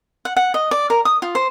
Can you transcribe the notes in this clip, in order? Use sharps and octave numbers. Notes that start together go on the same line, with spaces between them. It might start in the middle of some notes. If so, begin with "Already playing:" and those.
F#5
F#5
D#5
D5
A#4
D#6
F4
C5